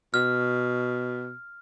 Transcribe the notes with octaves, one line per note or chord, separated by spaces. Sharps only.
B2 F6